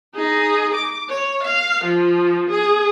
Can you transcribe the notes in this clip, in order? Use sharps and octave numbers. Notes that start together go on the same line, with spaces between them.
D#4 G#4
D6
C#5
F5
F3
G#4